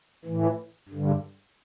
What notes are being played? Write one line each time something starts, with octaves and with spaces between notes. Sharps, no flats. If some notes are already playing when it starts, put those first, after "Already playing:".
A2 E3
G2
D3